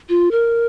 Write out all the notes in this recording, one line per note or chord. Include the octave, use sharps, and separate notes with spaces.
F4
A#4